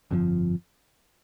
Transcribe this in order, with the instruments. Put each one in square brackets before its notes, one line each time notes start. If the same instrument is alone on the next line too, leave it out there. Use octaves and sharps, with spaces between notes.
[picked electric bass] G1 F2 C3 F3